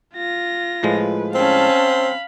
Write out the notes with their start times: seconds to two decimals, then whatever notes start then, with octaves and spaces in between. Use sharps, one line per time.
0.15 F4 A#6
0.83 A2 F3 G#3 B4
1.35 C4 C#4 F5 A5 B5